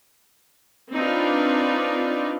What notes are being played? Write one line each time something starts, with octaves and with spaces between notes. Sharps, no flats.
C4 D4 D#4 F4 B4 D5